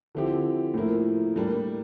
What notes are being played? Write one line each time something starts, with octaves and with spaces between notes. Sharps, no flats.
D3 F3 C4 E4 G4
A2 F3 A#3 E4
A2 G3 A#3 D4